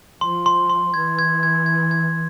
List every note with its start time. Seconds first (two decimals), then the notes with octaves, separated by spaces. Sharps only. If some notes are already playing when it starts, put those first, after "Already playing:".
0.21 F3 C6
0.46 C6
0.69 C6
0.94 E3 G#6
1.19 G#6
1.43 G#6
1.66 G#6
1.91 G#6